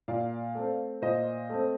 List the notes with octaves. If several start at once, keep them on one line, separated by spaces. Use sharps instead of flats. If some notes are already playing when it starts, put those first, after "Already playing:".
A#2 D5 F5
A3 C4
A#2 C5 D#5
A3 C4